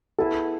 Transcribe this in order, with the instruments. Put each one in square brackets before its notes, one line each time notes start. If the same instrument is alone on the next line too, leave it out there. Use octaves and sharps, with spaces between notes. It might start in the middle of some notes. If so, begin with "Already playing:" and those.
[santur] B3 E4 G#4 [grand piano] A4